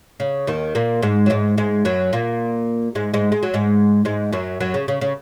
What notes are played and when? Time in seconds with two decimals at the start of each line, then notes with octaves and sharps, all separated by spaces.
0.20 C#3
0.47 D#2 D#3
0.75 A#2 A#3
1.02 G#2 G#3
1.26 F#3
1.30 G#2 G#3
1.58 G#2 G#3
1.85 F#2 F#3
2.13 A#2 A#3
2.95 G#2 G#3
3.14 G#2 G#3
3.32 G#3
3.43 F#3
3.54 G#2 G#3
4.05 G#2 G#3
4.33 F#2 F#3
4.60 F#2 F#3
4.74 C#3
4.88 C#3
5.01 C#3